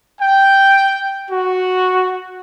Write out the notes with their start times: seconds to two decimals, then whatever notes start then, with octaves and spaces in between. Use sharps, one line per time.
0.20 G5
1.31 F#4